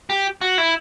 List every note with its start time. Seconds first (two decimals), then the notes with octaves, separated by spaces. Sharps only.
0.10 G4
0.41 F#4
0.58 E4